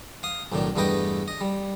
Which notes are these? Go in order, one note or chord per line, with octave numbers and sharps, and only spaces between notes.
F5 D#6
B1 A2 D#3 D4
E2 G2 A3 B4 D#5 G5
D#5
G3